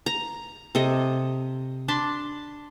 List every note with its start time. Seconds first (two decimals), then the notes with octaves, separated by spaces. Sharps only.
0.06 A#5
0.75 C3 A4 D#5
1.88 D4 A5 B5 C6